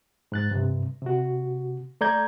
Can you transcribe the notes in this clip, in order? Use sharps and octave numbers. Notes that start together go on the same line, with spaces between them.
G#2 F#6 A6
G2 C3
C3 F#4
A3 A4 D5 A#5 G6 G#6